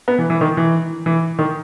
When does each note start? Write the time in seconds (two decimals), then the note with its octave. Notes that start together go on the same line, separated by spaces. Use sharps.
0.08 B3
0.18 E3
0.30 E3
0.41 D#3
0.57 E3
1.06 E3
1.39 D#3